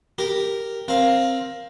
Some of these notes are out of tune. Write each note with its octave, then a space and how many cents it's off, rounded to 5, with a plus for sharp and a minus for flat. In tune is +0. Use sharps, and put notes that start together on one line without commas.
G4 +0 A#4 -5
C4 +15 A#4 +10 F5 +0